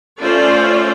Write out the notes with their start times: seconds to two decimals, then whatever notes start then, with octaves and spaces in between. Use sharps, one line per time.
0.21 A3 C#4 F4 C5 D5